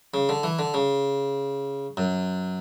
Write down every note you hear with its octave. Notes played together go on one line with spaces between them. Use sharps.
C#3
D3
E3
D3
C#3
F#2